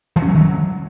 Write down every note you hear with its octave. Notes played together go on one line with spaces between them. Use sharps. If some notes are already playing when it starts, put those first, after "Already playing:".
E3
C#4
F#3
D#3
F#3